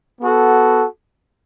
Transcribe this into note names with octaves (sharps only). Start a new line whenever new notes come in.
B3 F#4 A4